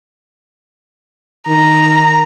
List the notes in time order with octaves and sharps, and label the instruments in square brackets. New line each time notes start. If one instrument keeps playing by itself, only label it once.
[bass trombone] D#3 [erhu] A#5